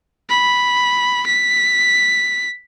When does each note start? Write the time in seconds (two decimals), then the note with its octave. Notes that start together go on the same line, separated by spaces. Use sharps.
0.30 B5
1.26 B6